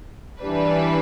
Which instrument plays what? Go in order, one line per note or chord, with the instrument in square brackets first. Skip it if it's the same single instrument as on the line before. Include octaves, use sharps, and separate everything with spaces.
[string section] E3 G3 D4 B4